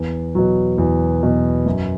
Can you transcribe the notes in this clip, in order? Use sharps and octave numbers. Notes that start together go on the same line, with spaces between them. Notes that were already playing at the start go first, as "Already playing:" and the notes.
Already playing: E2
B2 F#3
E2
B2 F#3
F#2